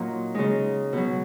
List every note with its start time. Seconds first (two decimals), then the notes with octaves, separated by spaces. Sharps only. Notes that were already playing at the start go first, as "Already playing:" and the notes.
Already playing: A#2 F#3 D#4
0.34 C#3 G#3 D#4
0.93 B2 F#3